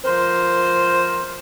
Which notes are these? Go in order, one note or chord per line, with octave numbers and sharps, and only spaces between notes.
F3 A#4 C5